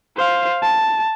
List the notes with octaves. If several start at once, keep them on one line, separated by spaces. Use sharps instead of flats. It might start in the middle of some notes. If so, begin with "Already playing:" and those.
C5 F5
A5